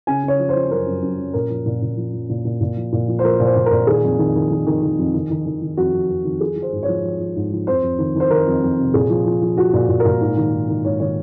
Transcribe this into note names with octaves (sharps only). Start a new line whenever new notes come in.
C#3 G#5
C#3 C#5
F3
C5
F3
F#2 A#4
F#2
F#2
F#2
A#2 A#4
F3
A#2
A#2
F3
F3
A#2
A#2
A#2
F3
A#2
F3
C5
F3 A#4
A#2
C5
A#2
A#4
A#2
D#3 G#4
F2
D#3
D#3
D#3
D#3
D#3
F2
D#3
D#3
D#3
D#3
F2 F#4
F2
F2
D#3
F3 G#4
F3
C5
G#2
C#5
F3
F3
F3
G#2
F3
F2 C5
F2
D#3
D#3 C5
D#3 A#4
F2
F2
C3
A#2 G#4
F3
F3
F3
F3 F#4
A#2
A#2
A#4
A#2
G#2
D#3
G#2
D#3
G#2 C#5
D#3 C#5